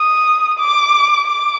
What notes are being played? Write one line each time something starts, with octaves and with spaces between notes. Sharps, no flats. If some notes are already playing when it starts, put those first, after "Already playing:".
Already playing: D#6
D6
D6